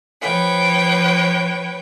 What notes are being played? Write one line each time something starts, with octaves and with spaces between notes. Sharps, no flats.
F3 B4 C#5 G5